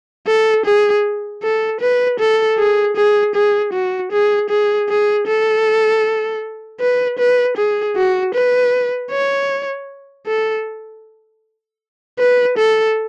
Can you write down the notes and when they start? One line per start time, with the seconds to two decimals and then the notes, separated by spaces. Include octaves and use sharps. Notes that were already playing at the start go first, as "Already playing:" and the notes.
0.27 A4
0.65 G#4
1.42 A4
1.81 B4
2.19 A4
2.58 G#4
2.96 G#4
3.35 G#4
3.73 F#4
4.12 G#4
4.50 G#4
4.89 G#4
5.27 A4
6.81 B4
7.19 B4
7.57 G#4
7.96 F#4
8.35 B4
9.11 C#5
10.27 A4
12.19 B4
12.57 A4